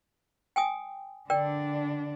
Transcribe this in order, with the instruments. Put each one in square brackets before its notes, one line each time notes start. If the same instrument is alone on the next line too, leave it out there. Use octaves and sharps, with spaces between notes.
[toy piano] G5 G#5 D#6
[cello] D3 D4 [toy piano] A#4 D5 G5